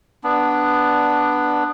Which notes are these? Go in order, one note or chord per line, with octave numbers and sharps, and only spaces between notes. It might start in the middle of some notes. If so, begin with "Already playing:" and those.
B3 D4